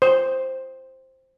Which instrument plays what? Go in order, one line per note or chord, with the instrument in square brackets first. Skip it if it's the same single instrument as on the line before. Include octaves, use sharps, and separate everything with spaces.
[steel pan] C5